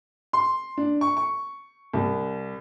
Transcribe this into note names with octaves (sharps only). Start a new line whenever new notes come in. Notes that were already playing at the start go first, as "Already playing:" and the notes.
C6
D4
C#6
C#6
C2